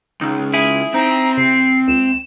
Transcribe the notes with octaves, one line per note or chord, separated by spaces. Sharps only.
C#2 D#4
E4 G#4
C4 D#4 A#5
C3 C7
C#2 E7